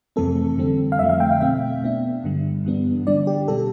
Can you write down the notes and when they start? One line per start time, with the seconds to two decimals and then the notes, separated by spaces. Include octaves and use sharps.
0.16 F2 C3 E3 A3 C4 A4
0.58 D3 G3 C4
0.92 F5
0.99 F2 D3 F3 A3 E5
1.09 F5
1.20 G5
1.30 F5
1.40 B2 A3 C4 E5
1.82 B2 B3 D4
2.24 G2 D3 G3
2.65 G2 E3 G3 B3 D4
3.06 D3 G3 D4 D5
3.27 G4
3.48 B2 G3 D4 A4